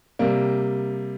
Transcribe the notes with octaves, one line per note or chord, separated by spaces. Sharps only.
C3 G3 A#3